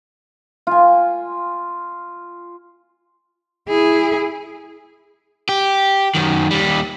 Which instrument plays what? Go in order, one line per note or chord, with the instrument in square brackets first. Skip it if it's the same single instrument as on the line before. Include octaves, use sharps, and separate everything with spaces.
[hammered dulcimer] F4 G#5
[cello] E4 G#4
[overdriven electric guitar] G4
F#2 D#3
D#2 G3